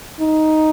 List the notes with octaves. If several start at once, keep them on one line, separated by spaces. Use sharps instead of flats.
D#4